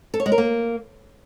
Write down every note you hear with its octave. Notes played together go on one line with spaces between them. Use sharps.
A4
C#5
G#3
A#4
A#3